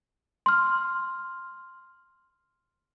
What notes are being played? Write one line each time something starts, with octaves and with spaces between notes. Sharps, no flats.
C6 F6